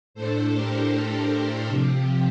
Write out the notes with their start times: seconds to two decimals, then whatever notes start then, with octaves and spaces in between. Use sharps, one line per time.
0.14 A2 A3 D4 A4 C5
0.53 G4 A#4
1.28 A4 C5
1.67 C3 F3 C4 G4